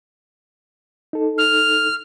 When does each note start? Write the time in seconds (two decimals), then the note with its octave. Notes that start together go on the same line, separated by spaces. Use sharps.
1.13 D#4 A4
1.38 F6